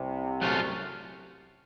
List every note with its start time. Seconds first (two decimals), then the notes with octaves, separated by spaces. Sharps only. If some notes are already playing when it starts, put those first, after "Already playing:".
Already playing: C2 C3
0.41 F#3 A3 C#4 F4